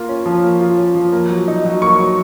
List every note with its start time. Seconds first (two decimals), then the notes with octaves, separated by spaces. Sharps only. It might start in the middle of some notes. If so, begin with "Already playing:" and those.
Already playing: A#3 F4
0.09 C#4
0.26 F3
0.44 A#3
0.61 F4
0.78 C#4
0.95 F3
1.12 A#3
1.29 F#3
1.48 D#4
1.65 F#3
1.82 A#3 C#6
1.99 F#3